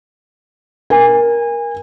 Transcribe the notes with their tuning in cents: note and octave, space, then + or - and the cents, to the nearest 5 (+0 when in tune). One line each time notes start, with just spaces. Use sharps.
A#4 +15 G#5 -30